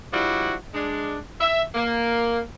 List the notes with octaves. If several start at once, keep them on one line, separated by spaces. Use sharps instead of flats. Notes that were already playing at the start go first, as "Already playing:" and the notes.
F3 G3 D4 E4 F#4
G#3 D4
E5
A#3